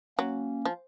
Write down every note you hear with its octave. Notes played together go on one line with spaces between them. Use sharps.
F#3 A#3 C#4
F3